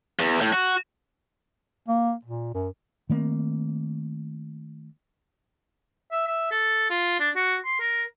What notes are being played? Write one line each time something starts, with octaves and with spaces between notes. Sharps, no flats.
E2
A2
F#4
A#3
A#2
F#2
D#3 A3 A#3 C4
E5
E5
A4
F4
D4
F#4
C6
A#4